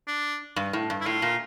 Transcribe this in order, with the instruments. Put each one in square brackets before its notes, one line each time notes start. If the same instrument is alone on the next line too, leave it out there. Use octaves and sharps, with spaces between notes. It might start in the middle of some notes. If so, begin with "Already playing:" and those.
[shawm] D4
[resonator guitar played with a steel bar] G2
A2
G2
[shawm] E4
[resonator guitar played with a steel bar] A2 [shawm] F4
[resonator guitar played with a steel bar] A#2